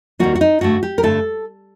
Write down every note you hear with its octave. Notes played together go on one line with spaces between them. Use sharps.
D#2 D#3 G3 A#3 F#4
F#4
D#4
G2 D3 A3 F#4
G4
A#4
G2 D3 A3 A4